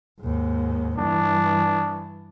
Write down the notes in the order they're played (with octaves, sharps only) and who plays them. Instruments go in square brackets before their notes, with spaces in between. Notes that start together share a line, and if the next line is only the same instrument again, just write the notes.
[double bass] D#2 G#2
[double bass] G2 E3 [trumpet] D4